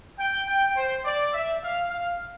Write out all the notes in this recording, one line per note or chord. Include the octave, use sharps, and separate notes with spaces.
G5
G5
C5
D5
E5
F5
F5